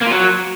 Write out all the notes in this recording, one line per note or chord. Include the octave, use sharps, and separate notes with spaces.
A#3
F4
F#3